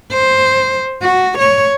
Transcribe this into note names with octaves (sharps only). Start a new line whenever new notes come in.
C5
F#4
C#5